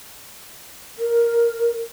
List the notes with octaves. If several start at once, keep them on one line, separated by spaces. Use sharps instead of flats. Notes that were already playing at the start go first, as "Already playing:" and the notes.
A#4